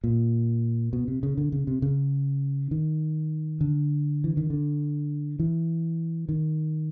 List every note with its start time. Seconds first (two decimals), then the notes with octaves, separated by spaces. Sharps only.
0.04 A#2
0.93 B2
1.08 C3
1.23 C#3
1.38 D3
1.52 C#3
1.67 C3
1.82 C#3
2.71 D#3
3.61 D3
4.24 E3
4.37 D#3
4.50 D3
5.40 E3
6.29 D#3